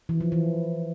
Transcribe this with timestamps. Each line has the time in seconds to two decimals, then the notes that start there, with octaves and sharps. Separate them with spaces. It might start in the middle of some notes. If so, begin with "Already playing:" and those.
0.09 E3
0.21 F3
0.32 E3